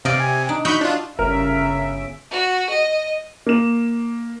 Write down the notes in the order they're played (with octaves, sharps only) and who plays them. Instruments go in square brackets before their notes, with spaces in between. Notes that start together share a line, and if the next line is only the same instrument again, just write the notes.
[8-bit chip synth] C3 [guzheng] D5 D#5 [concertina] F5 G5
[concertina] G#5
[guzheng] D4 [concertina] D#4
[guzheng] D#4 E4 F#4 [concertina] D#5 [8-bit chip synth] B5 C#6 G6
[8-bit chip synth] D4 F4
[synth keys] G1 D7 [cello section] C#3 E5 [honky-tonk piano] A#4
[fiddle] F#4
D#5
[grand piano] A#3 E7